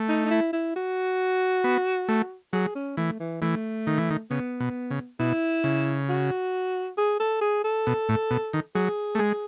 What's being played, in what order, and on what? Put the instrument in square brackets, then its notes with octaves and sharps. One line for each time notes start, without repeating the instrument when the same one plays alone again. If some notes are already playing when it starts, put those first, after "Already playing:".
Already playing: [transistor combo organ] A3
[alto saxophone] D#4
D#4
E4
E4
F#4
[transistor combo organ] B3
A3
[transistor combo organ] F#3 [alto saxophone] G#4
[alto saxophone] C#4
[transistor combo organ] E3 [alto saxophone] A3
[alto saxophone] E3
[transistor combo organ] E3 [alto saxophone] A3
[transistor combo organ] D#3
E3
D#3
[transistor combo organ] C#3 [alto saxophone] B3
[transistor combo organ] B2
C#3
[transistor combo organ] B2 [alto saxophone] E4
[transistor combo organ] C#3
[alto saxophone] F#4
G#4
A4
G#4
A4
[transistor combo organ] B2
A2
B2
D#3
[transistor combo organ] F#3 [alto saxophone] G#4
[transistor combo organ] A3
G#3